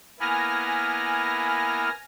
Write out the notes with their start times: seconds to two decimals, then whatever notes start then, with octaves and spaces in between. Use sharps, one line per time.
0.20 A#3 B3 E4 G#5 F6 A#6